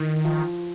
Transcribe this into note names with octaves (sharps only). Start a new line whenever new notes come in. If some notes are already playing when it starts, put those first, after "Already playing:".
Already playing: D#3 E3
F3